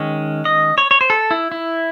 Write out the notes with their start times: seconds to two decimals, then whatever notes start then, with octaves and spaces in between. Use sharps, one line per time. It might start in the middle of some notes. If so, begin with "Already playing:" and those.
Already playing: D#3 G#3 C#4
0.45 D#5
0.78 C#5
0.91 C#5
1.01 C5
1.10 A4
1.31 E4
1.52 E4